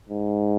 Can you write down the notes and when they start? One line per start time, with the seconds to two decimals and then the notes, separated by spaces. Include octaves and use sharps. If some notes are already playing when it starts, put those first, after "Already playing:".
0.10 G#2